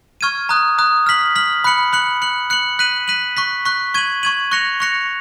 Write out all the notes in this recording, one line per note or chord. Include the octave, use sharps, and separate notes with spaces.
C#6 F6 G#6 D#7
A#5 D#6 F#6
A#5 D#6 F#6
F6 B6 F#7
F6 B6 F#7
B5 F#6 C#7 F#7
B5 F#6 C#7 F#7
F#6 C#7 F#7
F#6 C#7 F#7
F#6 B6 D#7 F#7
F#6 B6 D#7 F#7
C#6 F#6 B6
C#6 F#6 B6
C#6 G#6 D#7 F#7
C#6 G#6 D#7 F#7
C#6 F#6 A#6 C#7 F7
C#6 F#6 A#6 C#7 F7